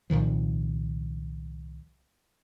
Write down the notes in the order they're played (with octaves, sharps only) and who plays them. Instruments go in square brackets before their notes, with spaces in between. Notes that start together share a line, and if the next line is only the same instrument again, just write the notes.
[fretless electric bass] C2 A#2 D#3 F3